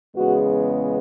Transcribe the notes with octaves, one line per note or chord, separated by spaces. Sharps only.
E2 C#3 G#3 B3 F#4